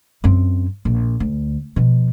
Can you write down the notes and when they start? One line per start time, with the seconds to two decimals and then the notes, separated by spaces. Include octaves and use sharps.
0.24 F#2 C4
0.85 A#1
1.20 D2
1.76 B2 F3